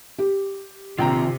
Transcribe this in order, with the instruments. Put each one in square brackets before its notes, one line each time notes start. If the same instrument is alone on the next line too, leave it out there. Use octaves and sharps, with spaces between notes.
[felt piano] G4
[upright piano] A#1 G5 A#5 [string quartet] C3 [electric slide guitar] D#3 C4 F4